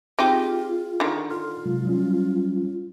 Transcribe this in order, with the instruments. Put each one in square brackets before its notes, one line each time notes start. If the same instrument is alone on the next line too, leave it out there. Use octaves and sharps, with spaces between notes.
[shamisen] C4 D#4 G4 [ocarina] F4 [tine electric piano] G#4
[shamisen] D3 D#3
[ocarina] F4 [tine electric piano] A4 C6 F6
[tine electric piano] C3 F#3 G#3
F#3 G3 C#4